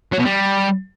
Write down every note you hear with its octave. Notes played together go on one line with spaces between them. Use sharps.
F#3
B2
G3